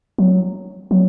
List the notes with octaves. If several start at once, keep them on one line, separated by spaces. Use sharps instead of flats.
F#3
F#3